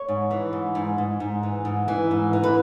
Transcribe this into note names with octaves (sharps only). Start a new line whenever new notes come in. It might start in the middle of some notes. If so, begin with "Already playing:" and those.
Already playing: C#5
G#2
E3
G#2
G#2
G#2
G#2
E3
G#2
E3
G#2
E3
B4